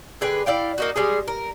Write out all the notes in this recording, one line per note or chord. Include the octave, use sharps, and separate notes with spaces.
D3 G#4 B4 G5
E4 D5 F5 G5
A#3 D#4 F#4
G3 G#3 G#4
A#4